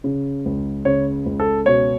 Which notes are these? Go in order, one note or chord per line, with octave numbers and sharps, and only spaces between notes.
C#3
C#2
C#3 C#5
C#2
A4
B2 C#5